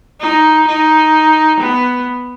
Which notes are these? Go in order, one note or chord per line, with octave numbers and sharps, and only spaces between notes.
D#4
D#4
B3